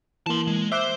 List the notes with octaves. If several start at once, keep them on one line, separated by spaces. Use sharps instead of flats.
E3 A#3 A5 C6
G#3
C5 E5 D6 F#6